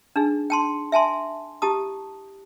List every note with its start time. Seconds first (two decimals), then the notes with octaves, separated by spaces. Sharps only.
0.16 D4 D#4 G#4
0.50 G5 A5 C6
0.92 E5 G#5 A5 C6
1.62 E4 G4 A5 D#6